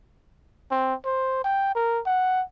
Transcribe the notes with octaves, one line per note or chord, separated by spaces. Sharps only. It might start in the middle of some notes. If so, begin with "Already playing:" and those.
C4
C5
G5
A#4
F#5